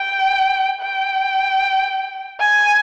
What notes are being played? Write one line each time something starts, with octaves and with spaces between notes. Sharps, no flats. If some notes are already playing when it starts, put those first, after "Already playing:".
Already playing: G5
G5
G#5